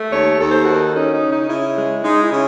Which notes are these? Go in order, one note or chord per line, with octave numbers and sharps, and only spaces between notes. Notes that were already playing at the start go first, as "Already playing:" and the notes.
Already playing: A3
D#2 A4 C#5
D#2 A4
C5
D#3 F#4 A4
C#4 D#4
D#4
C#3
D#4
C#3 E4
G#3
G#3 D#4
E4
C#3